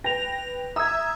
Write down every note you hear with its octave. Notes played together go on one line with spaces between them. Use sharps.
B4 G5 A#6 F7
E5 A#5 D#6 E6 G#6